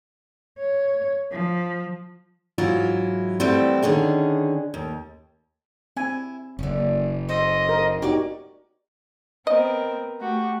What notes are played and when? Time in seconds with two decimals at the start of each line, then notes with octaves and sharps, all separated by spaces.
0.59 C#5
1.32 F3
2.58 G#2 E3 F#3 E4 F4
3.40 E3 G3 A3 B3 C4 E4
3.82 D3 D#3 C#4 G#4
4.74 D#2
5.97 C4 E4 G#5
6.59 F#1 D3 C#4
7.29 A4 C5 D#5
7.69 A#4
8.02 A#3 C#4 D#4 F#4 G4 D5
9.47 B3 C4 A#4 D#5
10.20 A3 F#4 G4